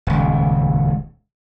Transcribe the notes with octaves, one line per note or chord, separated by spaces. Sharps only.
D#1 C#2